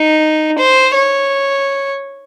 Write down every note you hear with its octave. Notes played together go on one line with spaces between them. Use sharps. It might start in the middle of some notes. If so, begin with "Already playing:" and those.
Already playing: D#4
C5
C#5